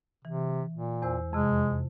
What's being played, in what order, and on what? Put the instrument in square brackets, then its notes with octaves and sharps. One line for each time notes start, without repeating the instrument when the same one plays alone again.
[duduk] C3 [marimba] E3
[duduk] A#2
[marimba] E2 C5 E6
[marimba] F2 C3 [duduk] G#3